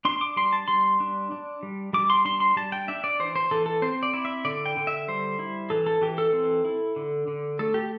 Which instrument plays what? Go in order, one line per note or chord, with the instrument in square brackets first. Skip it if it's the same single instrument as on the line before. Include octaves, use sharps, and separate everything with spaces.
[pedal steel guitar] D4 C6
D6
G3 C6
A5
G3 C6
D4
D4
G3
G3 D6
C6
D4 C6
C6
G3 A5
G5
D4 E5
D5
E3 C5
C5
E3 A4
A4
C4 C5
D5
E4
E5
D3 D5
G5
D3
E5
G3 C5
E4
E3 A4
A4
E3 G4
A4
C4
E4
D3
D3
A3 A4
G4